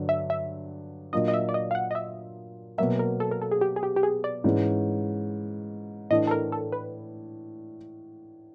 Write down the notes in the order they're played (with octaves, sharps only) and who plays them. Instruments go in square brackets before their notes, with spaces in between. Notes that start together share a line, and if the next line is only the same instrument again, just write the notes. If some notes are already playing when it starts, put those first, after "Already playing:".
Already playing: [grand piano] G2 D3 F#3
[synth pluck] E5
E5
[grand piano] A#2 F#3 A#3 D4 F4 [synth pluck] D#5
[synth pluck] D#5
E5
D5
D#5
F5
F#5
D#5
E5
[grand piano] B2 F#3 A#3 [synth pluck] E5
[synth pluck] A#4
A4
A#4
A4
G#4
G4
G#4
G4
G4
G#4
D5
[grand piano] G#2 E3 G#3 C#4
[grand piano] A2 E3 A3 D4 [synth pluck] D#5
[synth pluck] A4
A#4
A4
B4